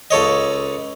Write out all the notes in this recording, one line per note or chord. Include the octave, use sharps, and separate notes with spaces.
C#2 A4 C#5 D#5